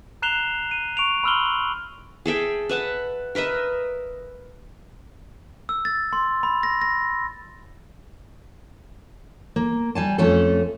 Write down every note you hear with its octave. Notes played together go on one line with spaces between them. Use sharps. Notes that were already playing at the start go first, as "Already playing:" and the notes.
A#5 F#6 C7 E7 F7 G7
D#7
C#6 D7 F7
B5 C6 E6 F6 F#7 G7
G#4 A4 E5 G5
B4 E5 F#5 A5
A#4 B4 D#5 E5
E6
A6
C6
B5
A#6
A#6
A#3
G3 G#5 A5
F2 A3 C#4 A4